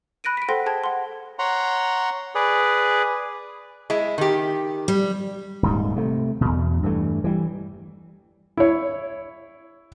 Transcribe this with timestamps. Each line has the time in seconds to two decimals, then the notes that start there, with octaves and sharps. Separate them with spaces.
0.24 B5 F#6 A#6 D7 D#7
0.37 B6 D7
0.49 A4 C5 F#5 G5 C6 A#6
0.66 G#4 G5 A5 G#6
0.84 F#5 C6
1.39 C#5 F#5 A#5 C6
2.35 G#4 B4 D5
3.90 G#3 E4
4.18 D#3 G4
4.88 G3
5.63 D#1 G#2 G3
5.96 C3 A3
6.41 E2 B2
6.83 G2 E3 A3
7.24 E3 G3
8.57 E4 C#5